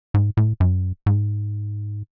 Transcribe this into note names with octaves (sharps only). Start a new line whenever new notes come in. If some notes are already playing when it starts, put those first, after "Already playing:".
G#2
A2
F#2
G#2